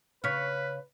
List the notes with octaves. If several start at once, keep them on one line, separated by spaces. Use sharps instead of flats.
C#3 B4 C#5 F6 B6